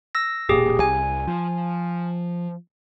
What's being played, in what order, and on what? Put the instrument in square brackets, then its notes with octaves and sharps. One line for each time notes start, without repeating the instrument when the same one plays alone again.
[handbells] E6 A#6
[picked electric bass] E1 A#2 [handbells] G4 G#4
[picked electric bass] C2 [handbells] G#5
[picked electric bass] F3